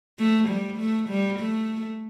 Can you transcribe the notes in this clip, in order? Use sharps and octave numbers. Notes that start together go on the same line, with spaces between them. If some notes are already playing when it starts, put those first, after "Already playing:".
A3
G3
A3
G3
A3